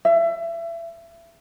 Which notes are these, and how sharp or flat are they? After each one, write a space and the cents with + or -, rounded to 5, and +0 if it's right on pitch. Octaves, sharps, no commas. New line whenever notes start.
E5 +30